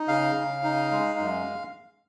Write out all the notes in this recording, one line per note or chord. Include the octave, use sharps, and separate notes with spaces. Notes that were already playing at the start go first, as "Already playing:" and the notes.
Already playing: D#4
C#3 F5
C#3
D#4
G#3
F#2